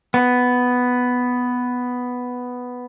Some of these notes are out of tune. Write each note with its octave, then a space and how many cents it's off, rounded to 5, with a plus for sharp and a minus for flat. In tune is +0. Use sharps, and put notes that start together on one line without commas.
B3 +5